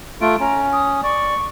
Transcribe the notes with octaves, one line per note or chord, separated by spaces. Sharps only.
A3 F4 D7
C#4 A#5
D#6
D5 C#6